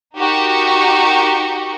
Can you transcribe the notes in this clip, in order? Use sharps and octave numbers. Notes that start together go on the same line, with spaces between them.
D#4 F#4 G4 A#4 C#6